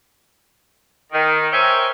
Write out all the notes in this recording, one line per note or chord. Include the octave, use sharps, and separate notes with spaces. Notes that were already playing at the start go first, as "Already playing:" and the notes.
D#3
A#4 C5 C#5 E5 G5 G#5